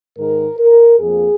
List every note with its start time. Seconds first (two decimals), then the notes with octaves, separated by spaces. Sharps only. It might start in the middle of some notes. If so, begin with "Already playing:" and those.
0.18 G#2 D#3 G#3 A#4
0.59 A#4
1.00 F2 F3 A#3 G#4